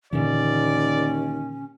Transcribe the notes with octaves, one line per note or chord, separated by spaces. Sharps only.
D#2 A#2 D3 E3 C#4 D5